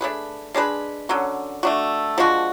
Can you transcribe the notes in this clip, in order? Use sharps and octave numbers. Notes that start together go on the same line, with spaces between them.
A3 D4 G#4 B4
G#3 D4 G#4 B4
D3 F#3 C#4
A3 D4 F#4
F3 G#3 D4 F#4